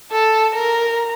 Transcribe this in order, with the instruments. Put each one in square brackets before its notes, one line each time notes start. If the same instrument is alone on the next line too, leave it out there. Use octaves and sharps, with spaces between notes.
[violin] A4 [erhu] A5
[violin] A#4 [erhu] A#5